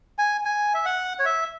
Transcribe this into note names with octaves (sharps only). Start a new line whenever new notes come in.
G#5
G#5
E5
F#5
C#5
E5